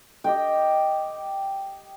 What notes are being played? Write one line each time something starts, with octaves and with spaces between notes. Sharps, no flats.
G4 D#5 G5